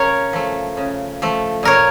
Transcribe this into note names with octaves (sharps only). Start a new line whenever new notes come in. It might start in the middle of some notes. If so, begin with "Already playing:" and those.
Already playing: C#3 A#4 C#5
F3 A3
C#3
F3 A3
A#2 A#4 C#5